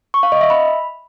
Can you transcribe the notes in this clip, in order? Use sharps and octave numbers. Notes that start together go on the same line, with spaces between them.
C#6
F5
D#5
E5
B5